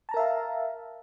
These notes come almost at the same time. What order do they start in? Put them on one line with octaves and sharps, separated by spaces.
A5 A#5 A#4 E5 F5